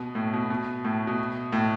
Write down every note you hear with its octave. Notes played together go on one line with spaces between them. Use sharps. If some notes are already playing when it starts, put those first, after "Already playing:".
Already playing: B2
A2
B2
B2
A2
B2
A2